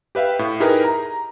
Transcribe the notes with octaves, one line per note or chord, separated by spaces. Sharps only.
G4 B4 E5 F5 G5
A2
D#4 E4 G4 G#4 A#4 B4
A#5